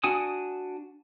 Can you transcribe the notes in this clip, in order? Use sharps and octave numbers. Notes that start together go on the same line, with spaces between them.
D4 F#4 G#5 D#6